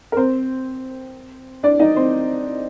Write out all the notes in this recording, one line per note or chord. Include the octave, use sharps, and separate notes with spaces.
A#4
C4 C5
D4 D5
D#4 D#5
C4 C5